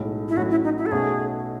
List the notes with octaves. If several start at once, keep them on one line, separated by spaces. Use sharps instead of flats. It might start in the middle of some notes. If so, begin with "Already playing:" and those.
Already playing: B1 A2 G#3
E4
A1 A2 F#3 F#4
E4
D#4
E4
A4
B1 B2 A3 C#4 F#4 G#4